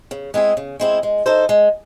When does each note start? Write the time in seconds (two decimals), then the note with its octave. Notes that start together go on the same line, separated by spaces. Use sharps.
0.11 C#3
0.34 G#3 C4 E4 G#4
0.57 C#3
0.80 G#3 C4 E4 G#4
1.03 G#3
1.26 D#4 A4 C5
1.49 G#3